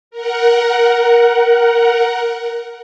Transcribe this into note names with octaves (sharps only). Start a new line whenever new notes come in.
A#4 F#5